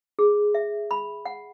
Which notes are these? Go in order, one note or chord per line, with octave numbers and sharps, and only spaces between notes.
G#4
E5
B5
F#5